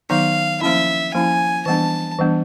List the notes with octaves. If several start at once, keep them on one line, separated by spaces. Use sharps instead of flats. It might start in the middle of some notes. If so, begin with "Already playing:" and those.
D#3 F#3 B3 D#4 F5
F3 A#3 C#4 E4 E5
F3 A#3 C#4 E4 G#5
E3 G3 B3 D4 A5
E3 G3 B3 D4